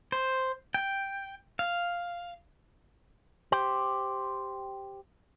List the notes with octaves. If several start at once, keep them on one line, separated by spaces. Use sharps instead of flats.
C5
G5
F5
G4 C5